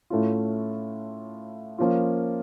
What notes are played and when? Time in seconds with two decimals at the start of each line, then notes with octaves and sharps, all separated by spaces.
0.10 A2 A3 C#4 F4
1.78 F3 A#3 C#4 F4